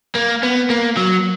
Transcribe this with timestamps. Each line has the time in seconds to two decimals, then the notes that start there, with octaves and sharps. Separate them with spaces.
0.16 A#3
0.43 B3
0.70 A#3
0.97 F#3